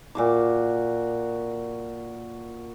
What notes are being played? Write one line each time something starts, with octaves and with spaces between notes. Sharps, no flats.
A#2 F#4 D6